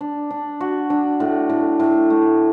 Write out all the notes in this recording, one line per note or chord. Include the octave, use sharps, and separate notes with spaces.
D4
D4
F#4
D4
A2
A2
A2
A3